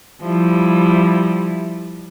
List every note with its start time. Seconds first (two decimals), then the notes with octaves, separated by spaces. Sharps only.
0.22 F3 G3 E4